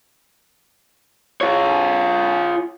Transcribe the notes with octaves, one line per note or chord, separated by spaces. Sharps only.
F4 C#5